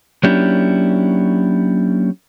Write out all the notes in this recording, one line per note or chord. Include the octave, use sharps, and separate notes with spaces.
F#3 A#3 C#4 D4 E4 G4